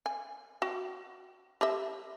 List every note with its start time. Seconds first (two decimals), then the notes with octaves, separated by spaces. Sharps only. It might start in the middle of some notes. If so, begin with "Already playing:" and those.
0.06 G#5
0.62 F#4 G5
1.61 G4 D#5 E5